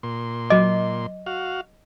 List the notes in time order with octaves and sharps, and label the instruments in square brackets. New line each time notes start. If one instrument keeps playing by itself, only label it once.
[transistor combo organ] A#2 C6
[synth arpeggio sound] F#3 D6 [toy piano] D#5
[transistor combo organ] F#4 F5